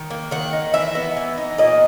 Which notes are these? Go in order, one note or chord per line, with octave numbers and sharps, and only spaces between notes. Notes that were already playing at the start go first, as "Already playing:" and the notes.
Already playing: D#3
A#3
D#3 F#5
D#4
E3 E5
B3
E3
D#4
A#2 D#5